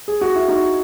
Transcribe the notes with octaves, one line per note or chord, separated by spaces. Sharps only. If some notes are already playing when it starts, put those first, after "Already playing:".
G#4
F#4
E4
D#4 F#4